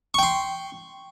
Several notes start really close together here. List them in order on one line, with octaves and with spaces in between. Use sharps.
C#6 G5 C6